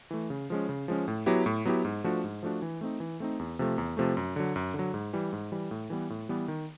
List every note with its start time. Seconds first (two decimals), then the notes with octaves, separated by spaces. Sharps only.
0.11 E3 A3
0.30 C#3
0.50 F3 G#3 C#4
0.69 C#3
0.88 F3 G#3 C#4
1.08 A2
1.26 F#3 B3 E4 G4
1.46 A2
1.65 F#3 B3 E4 G4
1.85 G#2
2.04 F3 A3 D4 F#4
2.24 G#2
2.43 F3 A3 D4 F#4
2.62 E3
2.81 A3 C4 D#4
3.00 E3
3.20 A3 C4 D#4
3.39 E2
3.59 C3 F3 A3
3.78 E2
3.97 C3 F3 A3
4.17 F#2
4.36 D3 F#3
4.56 F#2
4.74 D3
4.79 F#3
4.94 G#2
5.13 E3 G3
5.33 G#2
5.52 E3 G3
5.71 A2
5.90 E3 G3 B3
6.10 A2
6.29 E3 G3 B3
6.48 D#3